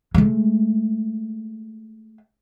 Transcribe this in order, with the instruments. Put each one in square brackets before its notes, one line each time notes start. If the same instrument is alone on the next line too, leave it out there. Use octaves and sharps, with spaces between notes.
[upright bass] G#3 A3